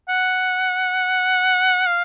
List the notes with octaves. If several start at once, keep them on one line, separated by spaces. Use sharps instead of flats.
F#5
F5